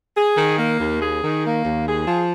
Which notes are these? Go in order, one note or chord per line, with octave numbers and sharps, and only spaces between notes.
G#4
D#3
A#3
D#2
G#4
D#3
A#3
D#2
G#4
F3